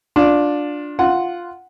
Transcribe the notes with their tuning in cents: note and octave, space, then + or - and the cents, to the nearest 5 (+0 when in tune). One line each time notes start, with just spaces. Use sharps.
D4 +0 F4 +25
F4 +0 F#5 +0